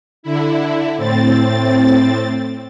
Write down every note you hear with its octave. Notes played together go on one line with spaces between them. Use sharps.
D3 E4
A2 C4 A6